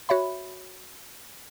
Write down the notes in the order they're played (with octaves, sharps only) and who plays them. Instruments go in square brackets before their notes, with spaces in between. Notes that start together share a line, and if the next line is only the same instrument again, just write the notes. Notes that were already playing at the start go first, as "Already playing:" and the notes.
[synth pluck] F#4 C#5 E5 B5